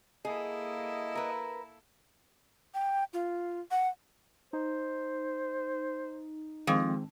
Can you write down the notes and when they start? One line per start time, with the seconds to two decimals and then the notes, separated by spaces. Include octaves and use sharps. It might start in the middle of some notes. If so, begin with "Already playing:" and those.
0.25 A#3 E4 G#4 A4 D#5
1.15 A#4 B4
2.74 G5
3.13 F4
3.71 F#5
4.53 D#4 C5
6.67 F2 D#3 G#3 C4